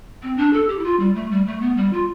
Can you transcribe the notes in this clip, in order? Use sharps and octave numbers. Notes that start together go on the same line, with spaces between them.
C4
D4
A4
G4
E4
F4
G3
A3
G3
A3
B3
G3
F4